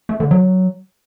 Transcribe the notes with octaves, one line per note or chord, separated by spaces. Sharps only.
A3
D3
F#3